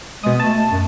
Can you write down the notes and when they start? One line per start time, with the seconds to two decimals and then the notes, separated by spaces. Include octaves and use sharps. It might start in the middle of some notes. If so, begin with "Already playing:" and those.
0.23 B2 G#3 D#6
0.40 A3 A5
0.71 F#2